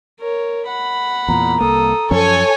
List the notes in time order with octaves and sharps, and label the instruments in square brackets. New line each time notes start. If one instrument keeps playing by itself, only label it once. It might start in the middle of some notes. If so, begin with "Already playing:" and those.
[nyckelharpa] A#4 C#5
F#5 B5
[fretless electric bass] E2 A#2 [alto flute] A#5
[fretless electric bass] C2 A#3 [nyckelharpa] A4 D#6
[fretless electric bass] F#2 F3 C#4 [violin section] A4 C#5 G#5 [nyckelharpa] C#6